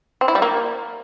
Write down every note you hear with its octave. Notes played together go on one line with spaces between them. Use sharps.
C4
E4
G3
A#3